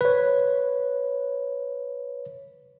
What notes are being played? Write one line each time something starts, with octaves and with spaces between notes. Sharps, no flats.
B4 C#5